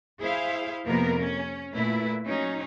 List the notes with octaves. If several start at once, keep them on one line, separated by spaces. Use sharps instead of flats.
E4 G#4 C5 F5
F2 C3 A#3 B3 A#4
C#4
A#2 A3 E4 B4
F#3 C#4 D#4